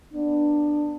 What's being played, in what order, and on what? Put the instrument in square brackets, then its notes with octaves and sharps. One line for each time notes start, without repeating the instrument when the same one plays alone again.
[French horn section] B3 D4